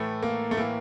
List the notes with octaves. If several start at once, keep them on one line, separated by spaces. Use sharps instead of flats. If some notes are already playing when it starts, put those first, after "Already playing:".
Already playing: A2 E3 A3
A#3
A3
A2 E3 A#3